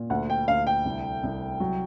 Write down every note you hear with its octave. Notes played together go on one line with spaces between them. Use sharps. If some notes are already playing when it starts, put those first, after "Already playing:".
Already playing: A#2
D2 F#5
G5
D2 F5
G5
C2
C2
F#3